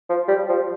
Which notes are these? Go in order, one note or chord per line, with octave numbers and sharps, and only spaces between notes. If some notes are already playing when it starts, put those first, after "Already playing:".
F3
G3
F3